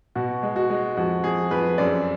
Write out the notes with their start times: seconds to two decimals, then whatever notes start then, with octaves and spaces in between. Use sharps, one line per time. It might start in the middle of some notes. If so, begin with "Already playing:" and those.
0.15 B2 F#4
0.43 G#3
0.56 F#4
0.70 G#3
0.97 F2 F#4
1.24 F2 G#4
1.51 F2 B4
1.78 F#2 D5